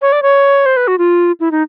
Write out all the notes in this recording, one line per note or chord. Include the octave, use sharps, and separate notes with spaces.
C#5
D5
C#5
C5
B4
F#4
F4
E4
D#4